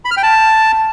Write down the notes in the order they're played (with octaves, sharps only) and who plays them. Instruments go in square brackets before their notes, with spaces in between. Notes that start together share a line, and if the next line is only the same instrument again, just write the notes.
[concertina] B5
F6
G5
A5